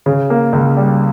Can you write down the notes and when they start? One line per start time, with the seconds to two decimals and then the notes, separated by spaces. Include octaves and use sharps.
0.06 C#3
0.30 A#3
0.53 C#2
0.77 G3